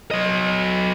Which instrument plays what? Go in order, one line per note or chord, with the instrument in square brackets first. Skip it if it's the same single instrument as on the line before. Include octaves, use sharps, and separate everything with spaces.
[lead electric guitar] F#3 D#5